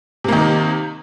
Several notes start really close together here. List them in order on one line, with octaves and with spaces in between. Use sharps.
C3 A#3 D#3 D#4